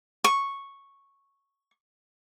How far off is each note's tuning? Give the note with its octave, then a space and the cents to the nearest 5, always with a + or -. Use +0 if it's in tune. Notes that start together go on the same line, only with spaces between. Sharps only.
C#6 -5